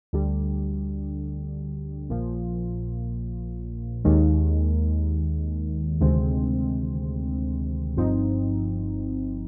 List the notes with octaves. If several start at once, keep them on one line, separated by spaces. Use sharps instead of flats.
D2 D3 G3
A#1 A#2 F3
D#2 D#3 G#3
D2 C3 D#3 G#3 C4
G1 G2 F3 C4 D#4